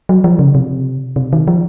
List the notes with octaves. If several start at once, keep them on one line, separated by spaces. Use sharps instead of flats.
F#3
F3
C#3
C3
C3
D#3
F3